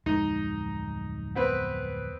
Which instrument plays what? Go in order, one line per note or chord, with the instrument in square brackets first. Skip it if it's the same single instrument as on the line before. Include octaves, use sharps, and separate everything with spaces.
[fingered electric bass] D1 F2 G#3 [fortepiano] D#4
[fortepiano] B3 C4 B4